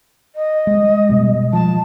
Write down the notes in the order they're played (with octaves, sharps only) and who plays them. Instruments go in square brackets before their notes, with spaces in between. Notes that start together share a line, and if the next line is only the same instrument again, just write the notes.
[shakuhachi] D#5
[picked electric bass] G#3
B2 G3 G#3
[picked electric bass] F3 [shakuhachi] A5